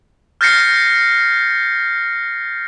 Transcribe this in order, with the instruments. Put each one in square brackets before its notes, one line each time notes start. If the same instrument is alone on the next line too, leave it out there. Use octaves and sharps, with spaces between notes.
[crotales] F6 G6 A6 A#6 C7 C#7